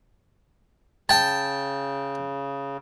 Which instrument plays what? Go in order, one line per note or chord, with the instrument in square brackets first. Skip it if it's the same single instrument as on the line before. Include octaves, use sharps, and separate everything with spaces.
[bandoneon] C#3 [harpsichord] G5 A5